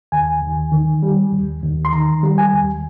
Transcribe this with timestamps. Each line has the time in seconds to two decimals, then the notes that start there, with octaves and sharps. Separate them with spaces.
0.12 D#2 G#5
0.42 D#2
0.72 D#3
1.03 G3
1.32 D#2
1.63 D#2
1.85 C6
1.92 D#3 A#5
2.23 G3
2.38 G#5
2.53 D#2